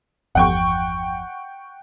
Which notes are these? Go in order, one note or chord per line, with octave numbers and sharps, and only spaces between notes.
G1 E2 F3 F#5 G5 C#6